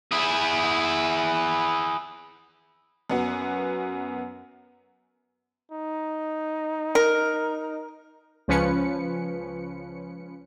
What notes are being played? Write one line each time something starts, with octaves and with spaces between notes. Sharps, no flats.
E4 G#4
F#2 B3 F#4
D#4
A#4
C#2 F3 C#4 B4 C#7